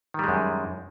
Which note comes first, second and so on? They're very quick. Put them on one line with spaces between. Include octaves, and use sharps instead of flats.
D#3 G3 G#3 F#2